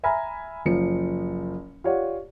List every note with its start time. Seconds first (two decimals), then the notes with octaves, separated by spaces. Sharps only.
0.04 E5 G#5 A#5 B5 F6
0.65 F#1 F3 C#7
1.84 F4 G4 C#5 D5 F#5